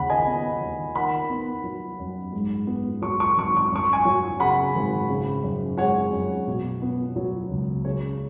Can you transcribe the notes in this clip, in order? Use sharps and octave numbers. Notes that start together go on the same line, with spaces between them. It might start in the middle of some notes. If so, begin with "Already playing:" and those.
Already playing: D#2 C#3 F#5 B5
D#5 G#5
B3
D#2
D#3 F#5 B5
B3
F#3
F#2
G#2
B3
F#3 C#6
C#6
G#1 C#6
C#6
F#2 C#6
G#5 C#6
F#3
C#3 F#5 B5
G#1
C#3
F#2
G#3 C#5 F#5
F#2
B2
B3
F#3
C#2
C#3 C#5